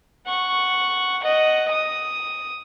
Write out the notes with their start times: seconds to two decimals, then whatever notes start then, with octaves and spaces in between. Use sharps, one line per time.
0.27 F#5 C#6
1.23 D#5 F#5
1.71 D#6